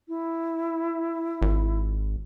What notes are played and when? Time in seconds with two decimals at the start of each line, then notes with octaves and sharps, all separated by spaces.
0.08 E4
1.42 G#1